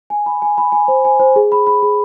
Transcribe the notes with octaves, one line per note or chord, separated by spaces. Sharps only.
G#5
B5
G#5
B5
G#5
C5
G#5
C5
G#4
B5
B5
G#4